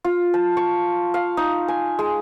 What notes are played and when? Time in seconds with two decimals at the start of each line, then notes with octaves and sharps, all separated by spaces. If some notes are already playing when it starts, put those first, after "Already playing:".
0.04 F4
0.34 A5
0.57 C#6
1.14 F5
1.37 D#4
1.68 G#5
1.99 G#3